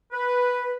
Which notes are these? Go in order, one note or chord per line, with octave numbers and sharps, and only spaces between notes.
B4